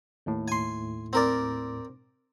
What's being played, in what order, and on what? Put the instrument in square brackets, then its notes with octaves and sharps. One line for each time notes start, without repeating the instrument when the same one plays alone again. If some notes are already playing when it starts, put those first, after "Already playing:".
[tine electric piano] D#2 A2
[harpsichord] G#5 C6
C4 A#4 D5